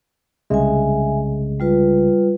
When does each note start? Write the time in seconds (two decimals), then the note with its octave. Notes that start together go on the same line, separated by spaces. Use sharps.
0.50 C2 C#3 G#3 E5 G#5
1.60 G3 F4 B4